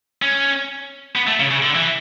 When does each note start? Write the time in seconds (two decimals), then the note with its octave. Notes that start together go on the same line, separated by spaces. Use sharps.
0.22 C#4
1.16 B3
1.27 A3
1.40 C#3
1.51 C#3
1.63 D3
1.75 E3